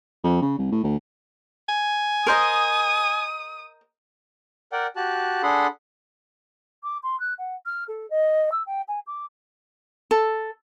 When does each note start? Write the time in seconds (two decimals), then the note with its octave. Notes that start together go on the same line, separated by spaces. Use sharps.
0.24 F2
0.42 C#3
0.58 C2
0.72 A2
0.84 D2
1.69 G#5
2.26 A#4 C5 D#5 D#6
4.72 A#4 D5 F#5 G5
4.96 F#4 G4 A5 F#6
5.43 D4 G#4 A4 F#5 B5 C6
6.84 D6
7.03 C6
7.20 F#6
7.38 F#5
7.66 F6
7.88 A4
8.10 D#5
8.52 E6
8.66 G5
8.88 G#5
9.07 D6
10.11 A4